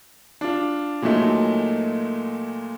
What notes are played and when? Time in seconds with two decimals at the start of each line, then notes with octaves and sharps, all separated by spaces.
0.41 D4 F4
1.02 A#2 F#3 G#3 A3 D#4